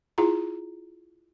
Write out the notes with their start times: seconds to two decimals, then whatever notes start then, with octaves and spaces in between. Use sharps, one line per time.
0.18 E4 F4 G#4 A#5